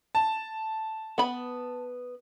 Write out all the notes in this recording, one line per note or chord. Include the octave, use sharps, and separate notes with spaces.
A5
B3 B5